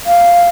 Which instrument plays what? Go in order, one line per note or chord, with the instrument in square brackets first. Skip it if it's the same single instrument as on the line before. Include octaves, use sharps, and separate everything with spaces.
[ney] F5